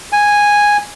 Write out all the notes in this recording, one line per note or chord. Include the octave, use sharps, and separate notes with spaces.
G#5